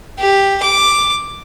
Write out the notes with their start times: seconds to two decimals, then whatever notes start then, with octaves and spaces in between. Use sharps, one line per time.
0.19 G4
0.63 D6